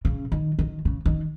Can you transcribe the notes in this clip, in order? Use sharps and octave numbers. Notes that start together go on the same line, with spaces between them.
C#3
D#3
D#3
C#3
D#3